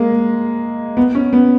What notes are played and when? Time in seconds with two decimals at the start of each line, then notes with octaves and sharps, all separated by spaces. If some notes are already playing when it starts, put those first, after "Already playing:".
Already playing: G#3 A#3
0.97 B3
1.15 C#4
1.33 B3